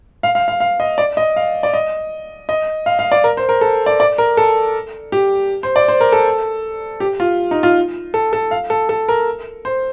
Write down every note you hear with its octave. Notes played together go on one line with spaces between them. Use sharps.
F5
F5
F5
F5
D#5
D5
D#5
F5
D5
D#5
D#5
F5
F5
D5
A#4
C5
A#4
A4
D5
D5
A#4
A4
G4
C5
D5
C5
A#4
A4
G4
F4
D#4
F4
A4
A4
F5
A4
A4
A#4
C5